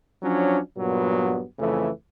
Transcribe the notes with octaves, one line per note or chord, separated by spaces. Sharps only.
F3 F#3 C#4 D4
G2 A#2 F#3 B3
F2 C#3 E3 A3